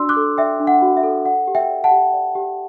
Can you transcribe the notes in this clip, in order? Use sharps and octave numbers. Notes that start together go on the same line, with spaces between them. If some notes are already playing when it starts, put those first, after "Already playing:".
Already playing: D4 F#4 D5 C6 E6
D6 F#6
A4
D5 E5 G5
D4
F#5
F#4
E5
A4
D5 F#5
G4
E5 G5
D5
F#5 A5
G4
D5
G4